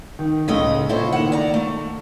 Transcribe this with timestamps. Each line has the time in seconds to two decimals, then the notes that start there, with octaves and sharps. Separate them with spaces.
0.19 D#3
0.48 C#2 A2 C#3 A3 D#5
0.89 A#2 E4 A4 C5 C#5
1.12 D#3 A#3 F#5 E7
1.32 D5 A#5
1.54 A3